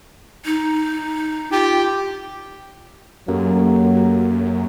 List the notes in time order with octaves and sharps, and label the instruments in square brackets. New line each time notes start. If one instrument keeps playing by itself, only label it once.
[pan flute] D#4
[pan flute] F4 [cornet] G4
[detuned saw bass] F#2 [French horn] F#3 [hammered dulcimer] A#3 [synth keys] C#4 G4 A4